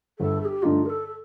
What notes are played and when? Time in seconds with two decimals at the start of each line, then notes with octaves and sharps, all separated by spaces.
0.19 G1 A4
0.41 A4
0.45 G4
0.62 G2 D3 A3 D#4 F4
0.85 A#4
0.90 A4
1.07 A4